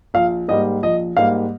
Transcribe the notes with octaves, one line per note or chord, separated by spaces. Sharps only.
A#1 F5
G#2 G3 A#3 D#5
A#1 D#5
G#2 G3 A#3 F5